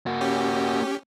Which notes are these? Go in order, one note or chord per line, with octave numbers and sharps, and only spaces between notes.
A#3 F#4
C#4 G4